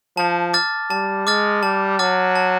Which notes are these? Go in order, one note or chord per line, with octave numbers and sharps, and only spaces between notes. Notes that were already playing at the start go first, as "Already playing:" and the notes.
F3 A5
D6 F6 A6
G3 A5
G#3 D6 F6 A6
G3 A5
F#3 D6 F6 A6
A5